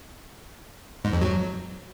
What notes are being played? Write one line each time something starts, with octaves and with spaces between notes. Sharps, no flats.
G#2
F2
F#3